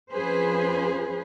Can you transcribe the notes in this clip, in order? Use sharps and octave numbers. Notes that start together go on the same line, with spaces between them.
F2 F3 C#4 G#4 B4 C5